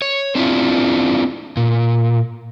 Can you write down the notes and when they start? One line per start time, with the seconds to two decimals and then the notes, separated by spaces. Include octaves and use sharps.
0.02 C#5
0.35 C4 D4 E4 F4
1.57 A#2